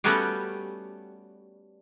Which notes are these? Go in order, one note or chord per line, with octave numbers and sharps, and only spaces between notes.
G3 A3 B3 C#4 F#4 G4